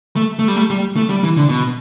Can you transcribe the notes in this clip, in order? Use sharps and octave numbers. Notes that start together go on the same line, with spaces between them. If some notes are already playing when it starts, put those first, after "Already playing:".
A3
A3
G3
A3
G3
A3
G3
E3
D3
B2